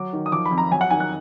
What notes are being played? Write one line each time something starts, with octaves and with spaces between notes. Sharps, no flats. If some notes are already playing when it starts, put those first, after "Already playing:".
Already playing: F#3 D6
D#3
D#6
F3 D6
B5
F2
A#5
F#3 G#5
F#5
D#3 G#5
F#6